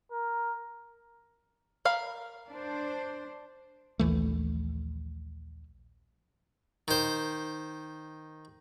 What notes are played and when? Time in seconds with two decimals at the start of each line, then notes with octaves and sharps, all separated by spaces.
0.11 A#4
1.85 A#4 F5 B5
2.51 D4 C5
3.99 A#1 D#2 E3 A3
6.88 D#3 C5